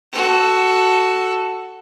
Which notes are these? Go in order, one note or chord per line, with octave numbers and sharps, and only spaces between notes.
F#4 A4